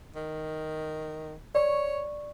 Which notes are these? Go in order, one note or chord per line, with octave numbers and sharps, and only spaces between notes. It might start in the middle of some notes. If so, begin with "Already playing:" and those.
D#3
C#5 D5 C#6